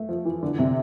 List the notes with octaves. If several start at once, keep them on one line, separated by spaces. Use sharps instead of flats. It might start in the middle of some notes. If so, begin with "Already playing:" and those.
Already playing: A3
F3
E3
D3
C3